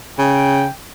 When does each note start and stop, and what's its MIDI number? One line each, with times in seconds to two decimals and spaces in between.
0.19 0.67 49
0.19 0.71 79